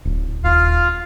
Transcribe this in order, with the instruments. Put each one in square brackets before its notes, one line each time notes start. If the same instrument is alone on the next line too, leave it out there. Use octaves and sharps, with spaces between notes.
[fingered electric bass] D1
[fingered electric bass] D#1 [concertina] F4 F5